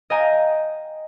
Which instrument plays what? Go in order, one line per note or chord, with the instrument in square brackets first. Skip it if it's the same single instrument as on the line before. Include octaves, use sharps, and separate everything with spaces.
[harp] D#5 F5 G5 G#5 A#5